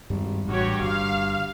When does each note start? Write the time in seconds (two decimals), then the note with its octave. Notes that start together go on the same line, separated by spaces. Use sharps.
0.10 G#1 G2 G3
0.48 A1 G2 F#4 G4 C#5
0.81 G1 F5